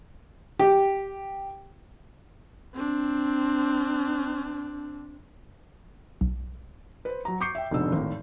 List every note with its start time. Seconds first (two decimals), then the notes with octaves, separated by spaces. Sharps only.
0.60 G4
2.74 C4 D4
6.21 B1
7.05 B4 C5
7.25 F#3 A#5
7.40 C#6 D6 G6 C7 C#7
7.55 E5 G5
7.71 F1 G#2 B2 D3 E6
7.92 G#1 A2